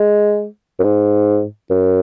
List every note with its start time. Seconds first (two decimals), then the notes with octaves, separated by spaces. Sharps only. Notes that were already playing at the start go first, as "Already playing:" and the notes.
Already playing: G#3
0.79 F#2
0.84 G#2
1.70 F#2